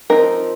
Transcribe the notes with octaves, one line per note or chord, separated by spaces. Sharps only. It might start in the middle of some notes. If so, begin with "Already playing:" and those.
F3 C4 D#4 A#4